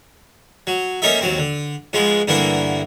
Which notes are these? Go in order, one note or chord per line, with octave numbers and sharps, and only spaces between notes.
F#3
A#3 C#4 D#4 A4 E5
D#2 F#3 C4
D3
G#2 F3 G#3 B3
G2 D3 E3 A#3 B3 E4